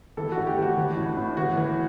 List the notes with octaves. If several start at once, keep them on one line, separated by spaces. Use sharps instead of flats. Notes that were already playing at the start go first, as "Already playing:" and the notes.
E3 A4
F#4
A2
G4
E3
F#4
E3
A2
A2
E3 F#4
E3